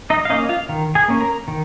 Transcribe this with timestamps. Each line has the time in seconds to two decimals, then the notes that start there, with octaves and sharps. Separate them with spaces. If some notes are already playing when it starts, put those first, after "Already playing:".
0.10 D#4 D#5
0.25 F5
0.30 A#3 C#4 D#4 D#5
0.49 F4 F5
0.69 D#3
0.95 G#4 G#5
1.08 A#3 C#4
1.21 A#4 A#5
1.48 D#3